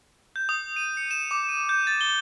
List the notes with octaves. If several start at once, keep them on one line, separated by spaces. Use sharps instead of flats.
G6
D#6
D#7
C#7
E7
D6
D#7
G6
A6
G7